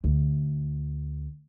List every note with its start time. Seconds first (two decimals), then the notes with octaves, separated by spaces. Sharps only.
0.04 D2